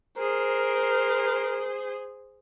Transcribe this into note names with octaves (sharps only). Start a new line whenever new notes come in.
G#4 A#4 C5